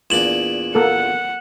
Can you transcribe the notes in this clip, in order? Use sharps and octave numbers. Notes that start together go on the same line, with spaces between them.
E2 A#2 D4 E7 F#7
A#3 A4 F#5